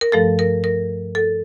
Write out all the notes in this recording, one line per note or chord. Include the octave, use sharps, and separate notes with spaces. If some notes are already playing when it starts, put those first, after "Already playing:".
A#4
G2 F3 A3 A4
A#4
A#4
A4